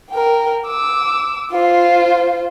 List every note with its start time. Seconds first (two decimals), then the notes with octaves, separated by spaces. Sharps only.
0.10 A#4 G5
0.67 D6 E6
1.51 F4 C5